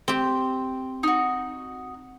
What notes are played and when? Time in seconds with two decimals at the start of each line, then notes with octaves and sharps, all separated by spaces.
0.08 C4 G4
1.03 D#4 F#4